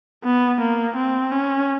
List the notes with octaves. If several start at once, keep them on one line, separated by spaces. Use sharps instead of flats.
B3
A#3
C4
C#4